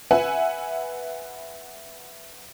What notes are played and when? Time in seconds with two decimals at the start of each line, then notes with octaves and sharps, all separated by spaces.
0.11 B4 E5 F#5 G#5